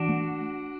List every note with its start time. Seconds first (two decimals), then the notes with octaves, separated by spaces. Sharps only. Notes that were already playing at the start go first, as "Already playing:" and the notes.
Already playing: E3 D4 F#4
0.09 A3